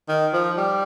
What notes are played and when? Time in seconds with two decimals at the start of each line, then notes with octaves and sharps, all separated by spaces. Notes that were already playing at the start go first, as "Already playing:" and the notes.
0.09 D#3
0.33 F3
0.58 G3